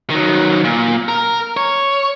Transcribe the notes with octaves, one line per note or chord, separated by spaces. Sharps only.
D#3 F#3
A#2
A#4
C#5